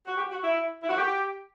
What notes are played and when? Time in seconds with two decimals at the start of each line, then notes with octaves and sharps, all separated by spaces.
0.07 F#4
0.18 G4
0.31 F#4
0.44 E4
0.82 E4
0.89 F#4
0.98 G4